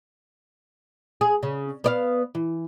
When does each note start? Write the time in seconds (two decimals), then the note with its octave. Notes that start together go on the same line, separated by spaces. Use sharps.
1.21 G#4
1.43 C#3
1.84 B3 D5 F5
2.35 E3